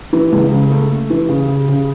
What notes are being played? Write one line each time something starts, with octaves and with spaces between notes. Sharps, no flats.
E3
C#2
C#3
A3
A3
E3
C#3
C#3
C#3